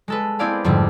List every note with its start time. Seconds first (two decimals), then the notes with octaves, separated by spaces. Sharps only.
0.08 G#3 A4 B4
0.39 C4 E4 G#4 D5 F5 B5
0.64 F2 G#2 D3 G3